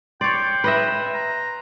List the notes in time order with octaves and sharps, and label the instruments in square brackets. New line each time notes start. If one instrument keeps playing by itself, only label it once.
[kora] C#5 D5 [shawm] G5 [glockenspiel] C6 C7
[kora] B4 D#5 E5
[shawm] A#5